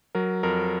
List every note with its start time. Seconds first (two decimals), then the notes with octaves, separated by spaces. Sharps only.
0.15 F#3 A#4
0.43 F2 A#4